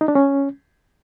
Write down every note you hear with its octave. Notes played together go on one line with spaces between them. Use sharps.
D#4
D4
C#4